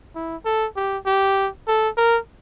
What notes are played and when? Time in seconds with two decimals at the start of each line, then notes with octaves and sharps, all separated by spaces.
0.15 E4
0.45 A4
0.76 G4
1.06 G4
1.68 A4
1.97 A#4